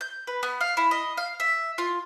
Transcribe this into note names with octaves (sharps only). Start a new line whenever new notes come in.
G6
B4
B3
F5
E4
D#5
F5
E5
F4